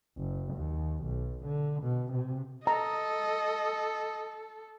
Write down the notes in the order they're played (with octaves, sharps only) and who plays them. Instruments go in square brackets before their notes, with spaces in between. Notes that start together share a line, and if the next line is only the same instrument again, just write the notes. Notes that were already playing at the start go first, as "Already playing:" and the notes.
[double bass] F#1
D#2
B1
D3
B2
C3
[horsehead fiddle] A4 [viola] D#5 [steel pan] A#5